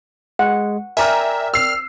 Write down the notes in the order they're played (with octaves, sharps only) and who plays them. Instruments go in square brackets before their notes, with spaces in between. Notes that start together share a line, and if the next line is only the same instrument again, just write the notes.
[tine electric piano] G#3 [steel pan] F#5
[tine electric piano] A#4 D5 G5 [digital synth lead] E5 [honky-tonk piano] G#5 A#5 F6
[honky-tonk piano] E6 C7 [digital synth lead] F6